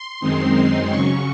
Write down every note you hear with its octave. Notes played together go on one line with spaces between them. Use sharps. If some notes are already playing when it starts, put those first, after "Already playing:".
Already playing: C6
F#2 D#3 G#3 C4 D#4
C#3 F#3 C#4 C#6